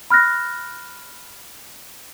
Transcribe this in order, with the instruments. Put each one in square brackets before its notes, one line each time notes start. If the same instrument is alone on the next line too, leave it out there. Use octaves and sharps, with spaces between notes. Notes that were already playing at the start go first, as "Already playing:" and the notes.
[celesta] B5 F6 F#6 A#6